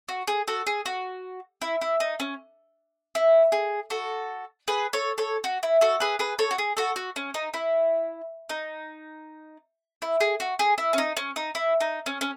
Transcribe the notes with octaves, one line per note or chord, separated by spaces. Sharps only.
F#4
G#4
F#4 A4
G#4
F#4
E4
E4
D#4
C#4
E4
G#4
F#4 A4
G#4 B4
A4 C#5
A4 C#5
F#4
E4
F#4 A4
G#4 B4
G#4 B4
A4 C#5
F#4
G#4
F#4 A4
F#4
C#4
D#4
E4
D#4
E4
G#4
F#4
G#4
E4
C#4
D#4
C#4
D#4
E4
D#4
C#4
C#4